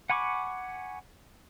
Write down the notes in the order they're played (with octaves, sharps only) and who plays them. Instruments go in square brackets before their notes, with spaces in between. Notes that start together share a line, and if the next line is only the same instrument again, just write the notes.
[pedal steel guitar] F#5 G#5 B5 C#6 D6